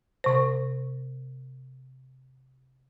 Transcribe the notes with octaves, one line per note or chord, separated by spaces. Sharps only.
C3 C5